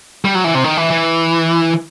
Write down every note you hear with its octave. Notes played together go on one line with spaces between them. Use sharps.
G3
F#3
E3
C3
D#3
E3
E3